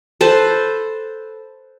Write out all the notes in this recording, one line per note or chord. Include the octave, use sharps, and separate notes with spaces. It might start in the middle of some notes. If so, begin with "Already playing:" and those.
A4 B4 C5